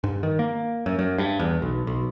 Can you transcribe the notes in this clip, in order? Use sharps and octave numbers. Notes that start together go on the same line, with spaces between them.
G2
D#3
A#3
F#2
F#2
G2
E2
B1
B1